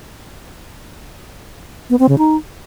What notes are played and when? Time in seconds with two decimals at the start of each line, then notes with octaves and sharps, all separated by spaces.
1.90 B3
1.99 C4
2.09 C#3
2.18 D#4